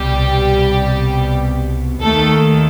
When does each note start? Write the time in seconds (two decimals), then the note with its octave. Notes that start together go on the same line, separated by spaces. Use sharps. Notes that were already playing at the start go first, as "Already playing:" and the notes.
Already playing: C2 B2 G3 G4
2.01 D#2 D#3 A3 A4